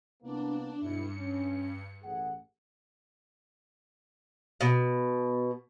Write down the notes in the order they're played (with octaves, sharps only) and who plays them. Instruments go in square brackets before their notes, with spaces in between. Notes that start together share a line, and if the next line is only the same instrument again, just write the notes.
[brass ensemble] C2 A#3 B3 [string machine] D4
[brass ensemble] B1 E4 [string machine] G2 C#7
[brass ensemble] C#4
A1 G#4 F#5
[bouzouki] B2